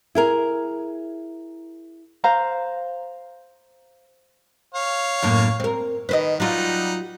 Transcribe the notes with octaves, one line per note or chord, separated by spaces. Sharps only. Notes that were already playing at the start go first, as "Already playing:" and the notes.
E4 G#4 A#4
C5 F5 A#5
C#5 F5
F#2 A2 A#3
C4 A#4
D#3 B4 C5 D#5
F#3 G3 D#4 F4 F#5